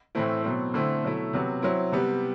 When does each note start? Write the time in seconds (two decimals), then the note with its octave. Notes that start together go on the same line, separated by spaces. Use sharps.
0.15 A2 E3 A3 C4 E4
0.44 B2 F#3 C4
0.74 D3 A3 C4 E4
1.04 B2 F#3 A3 E4
1.33 C3 F#3 B3
1.62 F#3 C4 E4
1.92 C3 G3 B3